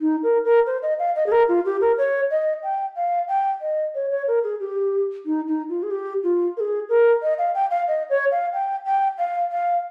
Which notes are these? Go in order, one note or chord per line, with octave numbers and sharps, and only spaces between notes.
D#4
A#4
A#4
C5
D#5
F5
D#5
G#4
A#4
F4
G4
A#4
C#5
D#5
G5
F5
G5
D#5
C#5
C#5
A#4
G#4
G4
D#4
D#4
F4
G#4
G4
F4
A#4
G#4
A#4
D#5
F5
G5
F5
D#5
C#5
F5
G5
G5
F5
F5